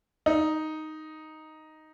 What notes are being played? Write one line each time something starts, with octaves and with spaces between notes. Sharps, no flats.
D#4